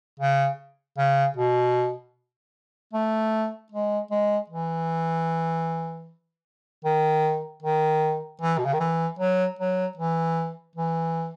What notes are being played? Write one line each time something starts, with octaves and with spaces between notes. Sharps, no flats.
C#3
C#3
B2
A3
G#3
G#3
E3
D#3
D#3
E3
B2
C#3
D#3
E3
F#3
F#3
E3
E3